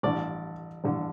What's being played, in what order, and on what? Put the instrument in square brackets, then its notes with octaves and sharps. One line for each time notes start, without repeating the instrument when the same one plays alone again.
[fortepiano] A1 G2 D3 D5
A1 G2 D3